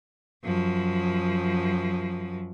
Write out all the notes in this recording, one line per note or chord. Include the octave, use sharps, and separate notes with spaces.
F#2 F3